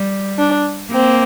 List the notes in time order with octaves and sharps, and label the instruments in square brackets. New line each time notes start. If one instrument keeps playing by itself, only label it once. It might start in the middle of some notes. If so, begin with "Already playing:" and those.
Already playing: [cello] G3
[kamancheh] D4
[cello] A#3 [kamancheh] C4